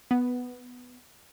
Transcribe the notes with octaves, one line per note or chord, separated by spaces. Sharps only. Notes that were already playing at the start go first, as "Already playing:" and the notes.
B3